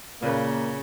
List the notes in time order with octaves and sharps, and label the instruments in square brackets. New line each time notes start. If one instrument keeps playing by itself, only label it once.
[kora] A#2 B4 [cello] C#3 [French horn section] A#3